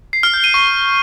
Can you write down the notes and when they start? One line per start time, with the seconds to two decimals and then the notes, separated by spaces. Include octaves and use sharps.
0.13 C7
0.23 F6
0.34 G6
0.44 D#7
0.54 C#6